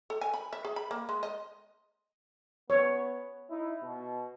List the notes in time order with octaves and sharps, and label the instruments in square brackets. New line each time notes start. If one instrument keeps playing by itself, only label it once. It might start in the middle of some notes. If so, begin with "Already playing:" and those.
[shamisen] A4
G#5
B5
E5
G#4
B5
A#3
G#3
D#5
[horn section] B3 [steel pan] C#5
[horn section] D#4 E4
B2